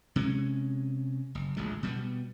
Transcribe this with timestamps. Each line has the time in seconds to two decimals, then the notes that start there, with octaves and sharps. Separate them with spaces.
0.16 C3 G#3 C#4
1.35 F#1
1.57 D1 A#1 G#3
1.83 B2 G3 A#3 B3